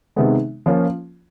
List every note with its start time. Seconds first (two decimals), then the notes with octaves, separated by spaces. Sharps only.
0.16 C3 D#3 G#3 B3
0.66 F3 A#3 C#4 F4